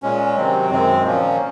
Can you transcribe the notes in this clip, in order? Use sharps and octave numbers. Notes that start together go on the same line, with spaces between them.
A#2 G#3 C#4
C3 D#3 F#3 C4
F#2 D#3 G#3 C4
A#2 F3 A#3 C#4